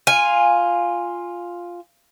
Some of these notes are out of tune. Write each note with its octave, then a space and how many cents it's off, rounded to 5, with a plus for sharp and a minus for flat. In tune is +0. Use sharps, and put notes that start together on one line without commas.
F4 +0 G#5 -10